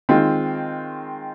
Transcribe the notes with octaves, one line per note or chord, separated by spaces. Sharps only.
D#3 G#3 C4 F4